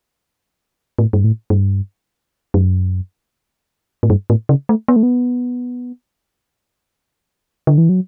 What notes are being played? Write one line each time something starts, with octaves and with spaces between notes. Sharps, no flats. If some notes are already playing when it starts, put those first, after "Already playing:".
A2
G2
A2
G2
F#2
A2
G2
A2
C#3
A3
B3
A3
B3
D3
E3
F#3